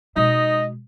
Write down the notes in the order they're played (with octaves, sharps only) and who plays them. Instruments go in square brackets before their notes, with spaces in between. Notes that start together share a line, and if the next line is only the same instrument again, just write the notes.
[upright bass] B2 G#3 [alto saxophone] D#4 [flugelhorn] D#5